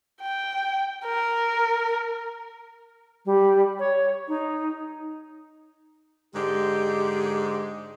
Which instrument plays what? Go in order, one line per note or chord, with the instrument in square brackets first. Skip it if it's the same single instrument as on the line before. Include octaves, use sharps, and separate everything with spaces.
[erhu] G5
A#4
[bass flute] G3
C#5
D#4
[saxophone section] G#2 D3 G#3 [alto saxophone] G4